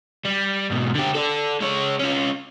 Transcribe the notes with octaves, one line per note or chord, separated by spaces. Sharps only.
G3
G#2 B2
D3 G4
A4 D5
G#3 C#5
C#4 F4